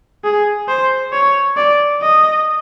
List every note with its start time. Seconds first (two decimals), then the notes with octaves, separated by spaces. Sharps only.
0.24 G#4
0.68 C5
1.13 C#5
1.57 D5
2.02 D#5